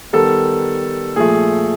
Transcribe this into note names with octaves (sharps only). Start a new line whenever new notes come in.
D#3 G3 B3 A4
A#2 F3 A3 G#4